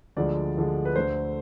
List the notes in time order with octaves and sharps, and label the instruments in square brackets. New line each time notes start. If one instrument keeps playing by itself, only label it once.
[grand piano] D2 D3 F3 G#3 D5
D2 D3 F3 G#3
B4
D2 D3 A3 C5